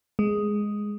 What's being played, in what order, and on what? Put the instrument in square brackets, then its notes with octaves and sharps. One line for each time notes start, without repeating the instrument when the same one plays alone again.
[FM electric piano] G#3